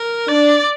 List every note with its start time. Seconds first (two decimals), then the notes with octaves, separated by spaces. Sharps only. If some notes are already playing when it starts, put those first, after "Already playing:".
Already playing: A#4
0.29 D4 D5